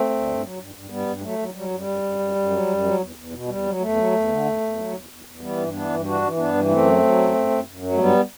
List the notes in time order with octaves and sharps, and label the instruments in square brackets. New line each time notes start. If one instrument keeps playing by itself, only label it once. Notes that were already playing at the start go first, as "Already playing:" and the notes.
Already playing: [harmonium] A3 C4
D2
G2
F#3
G2
G2
G2 G3 B3
G2
F#3 A3
F#3
F#3 G3
F#2 G3
F#2
F#2
F#2
F#2
F#3
F#2
F#3
E2
E2
B2
E2 G3
F#3
E2 A3
F#3
E2
D3
E2
E2
F#3
E2
E2
E2
E3 G3 B3
G2
E3 B3 D4
G2
E3 D4 F#4
E3
G2 B3 D4
E3
F#2 A3 C4
F#3
F#3
F#2
F#2
F#2
F#2
F#3
A3
G2 G3 B3